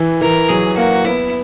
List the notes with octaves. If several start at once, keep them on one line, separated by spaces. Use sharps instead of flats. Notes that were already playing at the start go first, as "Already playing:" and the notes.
Already playing: E3
E3 A#4
F#3 G#4
A#3 F#4
B3 E4